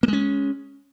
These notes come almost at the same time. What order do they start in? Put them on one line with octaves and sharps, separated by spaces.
A#3 G#3 C#4